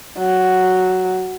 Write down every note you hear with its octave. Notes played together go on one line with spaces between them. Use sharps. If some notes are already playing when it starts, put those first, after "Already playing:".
F#3